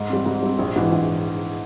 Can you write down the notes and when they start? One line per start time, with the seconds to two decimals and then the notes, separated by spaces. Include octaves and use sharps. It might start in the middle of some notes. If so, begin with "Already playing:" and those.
Already playing: G#2
0.10 G3 C4
0.26 G#2
0.43 G3 C4
0.59 A#1
0.76 G#2 E3
0.92 A#1